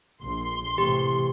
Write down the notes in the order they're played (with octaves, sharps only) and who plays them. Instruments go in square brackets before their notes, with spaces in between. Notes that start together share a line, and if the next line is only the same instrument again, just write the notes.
[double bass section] A#1 [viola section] C6
[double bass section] A2 C3 E3 [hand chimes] G4